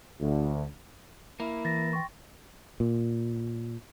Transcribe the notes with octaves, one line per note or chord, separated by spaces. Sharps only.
D2
A#3 E4
E3 A6 A#6
G5 C6 C#6
A#2